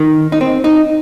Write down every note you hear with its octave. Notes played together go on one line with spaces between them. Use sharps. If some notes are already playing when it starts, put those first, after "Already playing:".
Already playing: D#3
D#4
C4
D#4